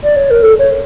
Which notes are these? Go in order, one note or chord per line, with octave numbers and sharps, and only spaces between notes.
D5
C#5
A#4
A4
C#5